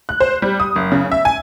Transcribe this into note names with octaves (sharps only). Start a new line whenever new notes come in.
F#6
C5
G3
D#6
F#1
C#3
E5
G#5